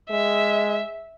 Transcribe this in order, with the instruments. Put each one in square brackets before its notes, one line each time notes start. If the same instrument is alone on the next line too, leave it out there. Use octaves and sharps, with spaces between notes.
[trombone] G#3 [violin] E5